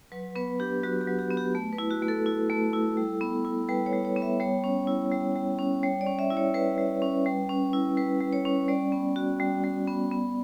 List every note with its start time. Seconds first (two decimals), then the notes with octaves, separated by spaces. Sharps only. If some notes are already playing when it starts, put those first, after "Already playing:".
0.12 F#3 B4
0.36 B3 B4
0.59 D4 G4
0.83 F#3 F#4
1.01 G4
1.07 F#3
1.19 G4
1.31 B3
1.37 G4
1.55 A3
1.73 B4
1.78 E4
1.91 F#4
2.02 A3
2.08 A4
2.26 E4
2.50 A3
2.73 E4
2.97 G3
3.21 B3
3.45 E4
3.69 G3 B4
3.86 C#5
3.93 G3
4.05 C#5
4.17 B3
4.22 E5
4.40 G3 C#5
4.64 C#4
4.87 E4
5.12 G3
5.36 G3
5.59 C#4
5.83 G3 C#5
6.01 D5
6.07 C#4
6.19 E5
6.30 E4
6.37 C#5
6.54 G3 B4
6.78 G3
7.02 C#4
7.26 G3
7.49 C#4
7.73 E4
7.97 G3 B4
8.21 G3
8.33 C#5
8.45 C#4
8.68 G3 D5
8.92 B3
9.16 F#4
9.40 G3
9.64 G3
9.87 B3
10.11 B3